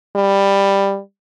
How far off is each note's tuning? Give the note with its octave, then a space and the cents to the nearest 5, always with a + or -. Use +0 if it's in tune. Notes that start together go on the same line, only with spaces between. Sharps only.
G3 +10